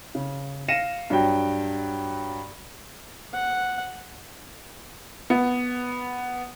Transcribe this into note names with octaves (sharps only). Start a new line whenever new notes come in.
C#3
F5 A#6 C#7 D#7 E7
G2 F#3 G5
F#5
B3